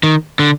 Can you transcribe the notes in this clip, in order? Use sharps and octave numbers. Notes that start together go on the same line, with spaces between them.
D#3
D3